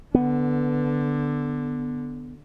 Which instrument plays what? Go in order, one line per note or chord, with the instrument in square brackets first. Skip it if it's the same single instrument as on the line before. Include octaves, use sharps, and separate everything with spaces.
[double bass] D3 [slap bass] B3